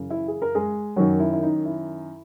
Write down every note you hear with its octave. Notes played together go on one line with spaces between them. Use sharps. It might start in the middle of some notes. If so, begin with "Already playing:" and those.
Already playing: F#2 C#3 E3
E4 E5
G#4
A#4
G#3 G#4
F#2 D#3 F#3 F#4
E4
E4
D#4
E4